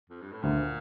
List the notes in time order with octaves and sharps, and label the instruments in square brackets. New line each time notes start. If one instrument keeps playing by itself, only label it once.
[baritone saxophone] F2
G2
A2
[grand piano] D2 [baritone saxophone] A#2